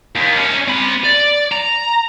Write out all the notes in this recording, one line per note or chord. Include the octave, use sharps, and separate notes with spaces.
D#2
C#4 D#4
C4 B5
D5
A#5